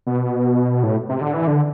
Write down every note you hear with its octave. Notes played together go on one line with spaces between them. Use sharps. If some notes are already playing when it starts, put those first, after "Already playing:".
B2
A2
C3
D3
E3
D3